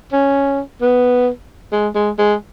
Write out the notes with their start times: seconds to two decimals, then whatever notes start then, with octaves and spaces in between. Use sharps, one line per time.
0.12 C#4
0.81 B3
1.72 G#3
1.95 G#3
2.18 G#3